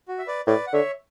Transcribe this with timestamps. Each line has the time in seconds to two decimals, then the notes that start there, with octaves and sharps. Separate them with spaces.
0.08 F#4
0.19 E5
0.27 B4 D5
0.47 A2 B4 D5
0.67 F#5
0.73 D3 C#5 E5